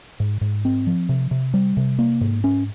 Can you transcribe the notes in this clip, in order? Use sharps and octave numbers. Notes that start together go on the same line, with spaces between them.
G#2
G#2
C4
F3
C3
C3
G3
C3
A#3
G#2
C#4